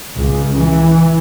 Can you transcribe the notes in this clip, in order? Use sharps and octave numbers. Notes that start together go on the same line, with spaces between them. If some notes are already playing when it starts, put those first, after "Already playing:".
C#2
E3